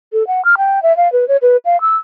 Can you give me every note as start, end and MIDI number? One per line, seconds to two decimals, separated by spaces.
0.13 0.26 69
0.27 0.44 78
0.45 0.55 89
0.58 0.82 79
0.83 0.95 76
0.97 1.11 77
1.13 1.27 71
1.28 1.37 73
1.42 1.57 71
1.65 1.80 77
1.81 1.96 88